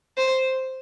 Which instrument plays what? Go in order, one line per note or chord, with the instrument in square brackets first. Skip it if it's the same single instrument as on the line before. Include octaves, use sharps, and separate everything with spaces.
[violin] C5